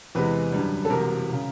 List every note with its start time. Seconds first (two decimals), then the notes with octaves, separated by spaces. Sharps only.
0.15 E2 C3 E3 G#3 B4
0.52 F#2 D3 G3
0.85 A4
0.90 E1 E2 C3 A#4
1.33 C#3